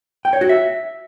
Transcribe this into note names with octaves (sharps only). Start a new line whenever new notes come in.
G5
C#5
F#4
E5